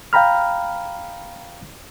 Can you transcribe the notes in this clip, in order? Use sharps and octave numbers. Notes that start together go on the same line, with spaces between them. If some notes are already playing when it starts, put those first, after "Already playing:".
F5 G5 A#5 B5 F6